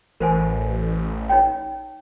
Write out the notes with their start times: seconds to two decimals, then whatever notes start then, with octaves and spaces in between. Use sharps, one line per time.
0.20 A1 A#4 C5 G#5
1.29 D#4 C#5 G5